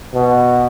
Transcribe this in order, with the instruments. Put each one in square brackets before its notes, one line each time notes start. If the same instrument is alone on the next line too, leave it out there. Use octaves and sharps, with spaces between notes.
[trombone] B2